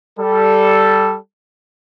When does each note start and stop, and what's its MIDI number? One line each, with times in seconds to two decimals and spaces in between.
0.19 1.17 55
0.19 1.17 69